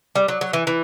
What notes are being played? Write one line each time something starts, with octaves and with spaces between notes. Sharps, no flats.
G3
F#3
F#3
E3
E3